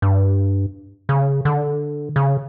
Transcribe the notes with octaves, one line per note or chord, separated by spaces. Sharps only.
G2
C#3
D3
C#3